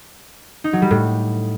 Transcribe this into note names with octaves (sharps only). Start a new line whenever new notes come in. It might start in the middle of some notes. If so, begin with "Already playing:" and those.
D#4
F#3
G3
A2